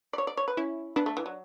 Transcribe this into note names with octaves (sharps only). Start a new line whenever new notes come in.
D5
C#5
D5
C#5
B4
C#4 E4
B3 D4
A3
E3
F#3